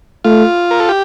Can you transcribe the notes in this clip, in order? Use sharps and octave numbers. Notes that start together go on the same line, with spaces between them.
A3 F4
A#4
A4
G4